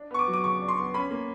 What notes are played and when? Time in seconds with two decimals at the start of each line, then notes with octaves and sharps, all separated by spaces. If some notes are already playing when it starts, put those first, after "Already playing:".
Already playing: D4
0.11 B3 C#6
0.19 D6
0.27 F#3
0.34 D6
0.44 C#3 C#6
0.61 D4
0.68 C6
0.77 B3
0.94 C#4 B5
1.11 A#3